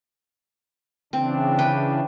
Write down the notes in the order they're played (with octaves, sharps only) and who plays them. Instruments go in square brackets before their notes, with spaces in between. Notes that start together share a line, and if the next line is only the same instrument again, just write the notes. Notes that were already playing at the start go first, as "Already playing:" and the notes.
[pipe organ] C#3 E3 D4 [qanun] C4
[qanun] B4 G5